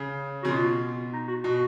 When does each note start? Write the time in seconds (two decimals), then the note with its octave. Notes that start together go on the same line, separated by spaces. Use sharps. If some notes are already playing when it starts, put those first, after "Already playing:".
Already playing: C#3
0.43 C#3 F#4
0.49 B2 F4
1.13 D#4
1.28 F#4
1.44 B2 F#4